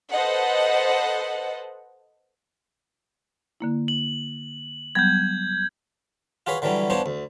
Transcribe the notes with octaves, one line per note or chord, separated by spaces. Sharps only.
A4 B4 C5 D#5 F#5
D3 A#3 E4
F#7
F#3 G3 B3 G6 G#6
F4 F#4 G#4 B4 C#5
D3 E3 F#3 G3 C#4
F3 B3 D4 C5 C#5
D2